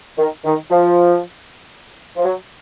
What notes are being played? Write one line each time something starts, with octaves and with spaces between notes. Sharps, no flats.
D#3
D#3
F3
F3
F#3